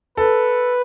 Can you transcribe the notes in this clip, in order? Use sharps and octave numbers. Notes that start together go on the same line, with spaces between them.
A4 B4